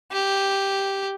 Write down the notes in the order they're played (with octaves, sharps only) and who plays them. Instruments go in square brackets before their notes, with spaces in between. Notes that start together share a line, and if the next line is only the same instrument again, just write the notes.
[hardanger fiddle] G4